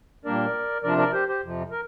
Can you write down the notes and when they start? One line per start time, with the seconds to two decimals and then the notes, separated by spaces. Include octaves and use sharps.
0.25 A#2 G3 A#3 D4 A#4 D5
0.83 C3 F3 D4 A#4 D5
0.98 A#4 D5
1.13 G4 C5
1.28 G4 C5
1.42 F2 C3 F3
1.71 A#4